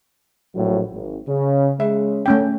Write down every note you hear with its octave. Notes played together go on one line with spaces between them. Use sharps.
A#1 A2 F#3
G#1
C#3
C#3 G#3 E5
A3 C#4 G5